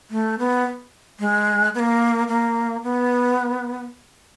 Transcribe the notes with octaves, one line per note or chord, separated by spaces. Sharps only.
A3
B3
G#3
B3
A#3
A#3
B3